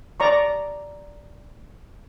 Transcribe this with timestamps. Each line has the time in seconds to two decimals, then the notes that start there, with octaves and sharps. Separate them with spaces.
0.20 D5 A#5 C#6